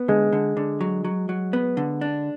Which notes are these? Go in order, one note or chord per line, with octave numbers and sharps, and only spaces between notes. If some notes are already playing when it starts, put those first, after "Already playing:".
Already playing: B3
D3 G#3
D3
D3
F#3
F#3
F#3
B3
D3
D4